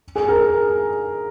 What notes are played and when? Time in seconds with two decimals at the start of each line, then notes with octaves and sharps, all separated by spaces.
0.15 G#4
0.29 A#4